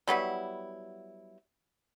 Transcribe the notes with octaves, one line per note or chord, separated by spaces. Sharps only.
F#3 G3 B3 E4